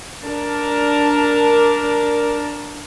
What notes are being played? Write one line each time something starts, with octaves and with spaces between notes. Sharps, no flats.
D4 A#4 A5